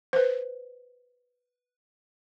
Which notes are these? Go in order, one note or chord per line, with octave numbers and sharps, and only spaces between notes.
B4 C5